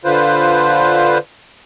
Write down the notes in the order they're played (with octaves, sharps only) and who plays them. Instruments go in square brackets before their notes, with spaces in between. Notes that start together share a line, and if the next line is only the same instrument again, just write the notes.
[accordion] D3 F4 B4 C5